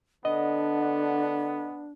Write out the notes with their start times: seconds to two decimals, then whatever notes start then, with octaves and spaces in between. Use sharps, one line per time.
0.25 D3 B3 D4 D#5